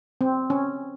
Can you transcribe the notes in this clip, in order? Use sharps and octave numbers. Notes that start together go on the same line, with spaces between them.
C4
C#4